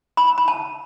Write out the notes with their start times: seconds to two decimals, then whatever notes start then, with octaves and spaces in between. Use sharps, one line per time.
0.17 B5
0.38 B5
0.48 A5